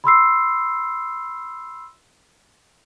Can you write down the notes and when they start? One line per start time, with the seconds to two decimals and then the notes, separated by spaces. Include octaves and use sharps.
0.04 B5 C6 E6 C7